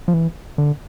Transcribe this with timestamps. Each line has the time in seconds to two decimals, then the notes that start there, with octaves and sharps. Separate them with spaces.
0.08 F3
0.14 E3
0.58 D3